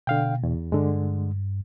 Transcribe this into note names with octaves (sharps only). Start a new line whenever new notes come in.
B2 D3 F5 G5
E2
G2 D3 G#3